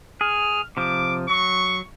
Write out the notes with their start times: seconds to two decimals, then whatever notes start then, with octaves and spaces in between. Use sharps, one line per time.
0.21 G#4 F6
0.77 C3 F3 D6
1.29 F#3 C#6